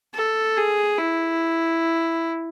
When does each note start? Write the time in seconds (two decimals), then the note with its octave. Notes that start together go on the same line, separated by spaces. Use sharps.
0.14 A4
0.57 G#4
0.98 E4